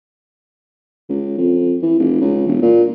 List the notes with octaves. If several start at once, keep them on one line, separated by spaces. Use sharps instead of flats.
C#2
F2
E3
F1
C#2
E1
A#2